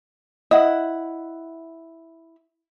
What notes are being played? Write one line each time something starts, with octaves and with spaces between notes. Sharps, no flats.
E4 D#5 F#5